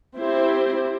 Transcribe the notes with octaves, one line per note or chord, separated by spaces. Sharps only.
C4 E4 G4 C5